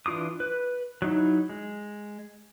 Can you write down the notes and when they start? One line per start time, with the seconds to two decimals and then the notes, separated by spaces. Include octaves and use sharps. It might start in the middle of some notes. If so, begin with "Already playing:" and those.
0.06 E3 D4 F4 D6 D#6
0.40 B4
1.02 F#3 D#4 E4
1.49 G#3